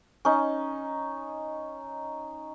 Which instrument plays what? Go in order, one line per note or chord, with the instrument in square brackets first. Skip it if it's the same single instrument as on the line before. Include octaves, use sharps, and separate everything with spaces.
[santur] C#4 D#4